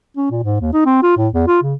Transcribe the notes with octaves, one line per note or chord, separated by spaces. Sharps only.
C#4
A#2
G#2
D#2
D#4
C4
F4
A2
E2
F4
C#3